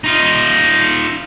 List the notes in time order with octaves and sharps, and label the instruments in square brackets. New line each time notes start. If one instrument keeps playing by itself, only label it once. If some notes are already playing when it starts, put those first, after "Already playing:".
[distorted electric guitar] D#4 F4